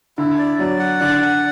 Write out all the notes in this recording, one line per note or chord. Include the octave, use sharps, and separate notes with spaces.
D3 E4
D5
F#3 D5
F#5
D3 D5
F#5